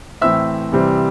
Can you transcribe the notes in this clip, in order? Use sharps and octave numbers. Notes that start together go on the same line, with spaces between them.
A2 E3 C4 E5 E6
C3 E3 G3 C4